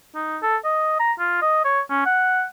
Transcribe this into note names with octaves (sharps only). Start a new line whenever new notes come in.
D#4
A4
D#5
A#5
F4
D#5
C#5
C#4
F#5